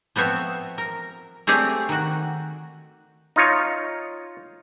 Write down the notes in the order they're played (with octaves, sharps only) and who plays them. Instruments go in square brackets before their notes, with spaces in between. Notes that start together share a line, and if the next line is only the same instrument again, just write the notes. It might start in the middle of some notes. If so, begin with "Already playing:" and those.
[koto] F3 B3 C4 C#5 E5
A#4
A3 C4 G4 G#4 C#5 D5
D#3 F#4
[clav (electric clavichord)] D#4 F4 C#5